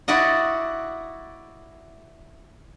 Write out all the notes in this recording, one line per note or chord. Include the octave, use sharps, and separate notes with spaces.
E4 F#4 D5 D#5 F#5